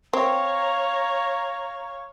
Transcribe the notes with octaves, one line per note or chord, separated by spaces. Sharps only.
C4 C#5 F5 A#5